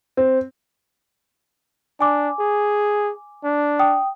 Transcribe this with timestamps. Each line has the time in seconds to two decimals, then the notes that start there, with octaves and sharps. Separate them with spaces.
0.17 C4
2.01 D4 G#5 D6
2.39 G#4
3.44 D4
3.79 G5 D#6